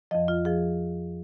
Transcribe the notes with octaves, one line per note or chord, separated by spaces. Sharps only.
F2 F3 D#5
F4
F3 G#4